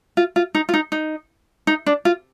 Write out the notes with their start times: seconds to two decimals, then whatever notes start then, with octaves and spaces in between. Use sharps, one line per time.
0.17 F4
0.36 F4
0.55 D#4
0.69 F4
0.74 D#4
0.92 D#4
1.67 D#4
1.86 D4
2.05 F4